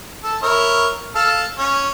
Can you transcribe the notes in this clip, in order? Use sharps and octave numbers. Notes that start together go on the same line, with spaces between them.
A4
E4 A#4 C#5
A4 F5 A5
C#4